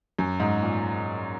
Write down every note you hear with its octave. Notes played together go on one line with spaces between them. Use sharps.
F#2
G#2
A#2